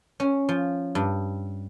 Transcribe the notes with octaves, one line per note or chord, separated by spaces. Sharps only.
C#4
F3
G2